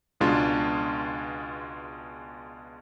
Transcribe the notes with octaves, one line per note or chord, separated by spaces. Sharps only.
C#2 B2 G#3 D4 F4